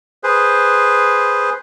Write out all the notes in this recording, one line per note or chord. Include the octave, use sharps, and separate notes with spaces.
G#4 B4 C5